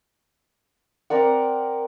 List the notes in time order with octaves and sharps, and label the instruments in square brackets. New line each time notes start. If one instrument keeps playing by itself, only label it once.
[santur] C4 A#4 D5 F#5